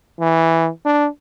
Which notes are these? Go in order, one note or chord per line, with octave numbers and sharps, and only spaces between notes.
E3
D4